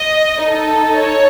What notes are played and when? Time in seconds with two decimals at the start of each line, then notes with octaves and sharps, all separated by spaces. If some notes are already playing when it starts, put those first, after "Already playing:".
Already playing: D#5
0.42 D#4 A4
0.96 C#5